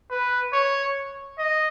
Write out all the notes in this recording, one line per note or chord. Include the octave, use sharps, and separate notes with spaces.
B4
C#5
D#5